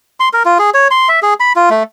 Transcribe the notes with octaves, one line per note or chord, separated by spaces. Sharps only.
C6
A#4
F4
G#4
C#5
C6
E5
G#4
B5
F4
A3